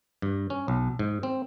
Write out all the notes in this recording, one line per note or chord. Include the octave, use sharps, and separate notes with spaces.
G2
C#4
B1
G#2
C4